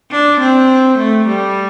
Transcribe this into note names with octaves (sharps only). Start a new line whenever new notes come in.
D4
C4
A3
G3